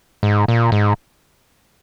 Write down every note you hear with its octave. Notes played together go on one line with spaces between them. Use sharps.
G#2
A#2
G#2